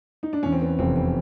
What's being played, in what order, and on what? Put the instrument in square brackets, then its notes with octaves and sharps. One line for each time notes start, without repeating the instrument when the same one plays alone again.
[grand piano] D#4
D4
E2 C#4
C4
B3
F1 C4
C4